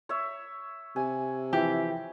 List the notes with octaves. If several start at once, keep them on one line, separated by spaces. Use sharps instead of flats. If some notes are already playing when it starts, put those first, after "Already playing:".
C#5 E5
C3 G#5
E3 F3 E4 G4